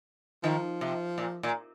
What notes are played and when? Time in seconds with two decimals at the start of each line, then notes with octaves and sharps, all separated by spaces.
0.43 D#3 F3
0.81 C3
1.18 A#2
1.43 A#2